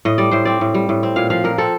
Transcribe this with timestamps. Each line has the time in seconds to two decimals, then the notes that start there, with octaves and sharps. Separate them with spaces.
0.05 A2 D#5
0.18 G3 D5
0.31 A2 C5
0.45 C4 D5
0.61 A2
0.74 G3
0.89 A2
1.03 C4
1.16 A#2 F5
1.30 F3 F5
1.44 A#2 A#4
1.58 C4 A4